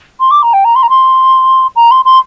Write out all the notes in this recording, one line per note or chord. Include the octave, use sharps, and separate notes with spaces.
C6
D6
A#5
G5
A#5
C6
A#5
C6
A#5
C6
C6